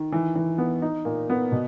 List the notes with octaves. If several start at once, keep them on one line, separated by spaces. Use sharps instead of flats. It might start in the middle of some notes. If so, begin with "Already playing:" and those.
Already playing: D#3
E3
E3
B3
D#4
A#2
B3
B2